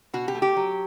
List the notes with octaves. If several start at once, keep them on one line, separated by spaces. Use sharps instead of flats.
B2 F#4
G4
A3
G4
F#3